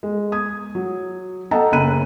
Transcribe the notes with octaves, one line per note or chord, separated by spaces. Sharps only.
G#3
D#6 G#6
F#3
A4 D#5 F#5 G5 A5 A#5
F#1 C#3 B5 F#6 D#7